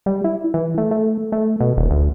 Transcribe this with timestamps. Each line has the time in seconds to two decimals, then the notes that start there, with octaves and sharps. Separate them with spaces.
0.06 G3
0.24 E4
0.54 E3
0.78 A3
0.91 A3
1.32 A3
1.60 B2
1.77 D#1
1.90 D2